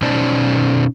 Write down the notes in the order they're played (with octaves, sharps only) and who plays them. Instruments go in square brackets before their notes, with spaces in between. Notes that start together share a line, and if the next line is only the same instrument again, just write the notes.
[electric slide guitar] B2 C#4 D#4 C5 D5 A5